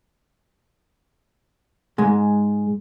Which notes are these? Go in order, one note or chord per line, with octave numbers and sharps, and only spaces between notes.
G#2 G#3